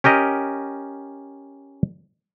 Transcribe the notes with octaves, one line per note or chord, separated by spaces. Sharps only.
C#4 G4 A#4 D#5